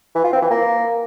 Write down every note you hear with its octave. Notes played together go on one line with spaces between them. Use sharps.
E3
F4
C4
E3
A#3